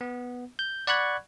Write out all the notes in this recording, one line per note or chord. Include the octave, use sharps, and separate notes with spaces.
B3
G6
D5 F#5 B5 C#6 F#6 G#6